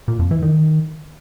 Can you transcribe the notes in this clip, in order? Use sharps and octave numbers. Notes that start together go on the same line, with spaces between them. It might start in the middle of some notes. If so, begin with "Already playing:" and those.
A#2
F2
E3
D#3